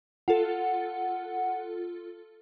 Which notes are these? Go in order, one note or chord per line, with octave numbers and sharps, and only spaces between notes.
F4 A4 F#5